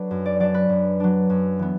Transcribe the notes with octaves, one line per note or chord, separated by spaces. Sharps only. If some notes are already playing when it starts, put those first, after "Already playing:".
Already playing: F#3 D4 A4 B4
F#2
D5
F#3 D4 D5
B4
F#2
F#3 D4
F#2
E3 B3